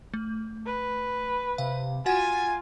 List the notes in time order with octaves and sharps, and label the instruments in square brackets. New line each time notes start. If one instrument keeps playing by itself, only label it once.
[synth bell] A3
[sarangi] B4
[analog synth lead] C3 [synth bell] F5
[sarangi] F4 [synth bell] F#4 F#5 [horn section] G#5 [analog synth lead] A6